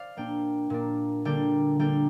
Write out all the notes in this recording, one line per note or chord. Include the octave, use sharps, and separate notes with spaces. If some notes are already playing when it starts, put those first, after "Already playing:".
Already playing: C5 D5 F5
A#2 A#3 D4 G5
A#2 A#3 D4
D3 G3 A#3 D4 G5
D3 G3 A#3 D4 G5